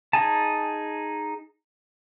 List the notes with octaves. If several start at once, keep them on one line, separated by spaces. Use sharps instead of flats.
D#4 G#4 G#5 A5